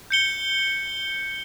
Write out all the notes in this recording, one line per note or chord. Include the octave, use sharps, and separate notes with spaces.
G6 C#7 G7